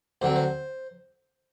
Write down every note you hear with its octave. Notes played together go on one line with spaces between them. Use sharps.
D2 D3 F#3 C4 C5
C5